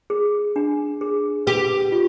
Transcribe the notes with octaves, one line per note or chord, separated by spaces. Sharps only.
G#4
D4
G#4
G4 B4
F4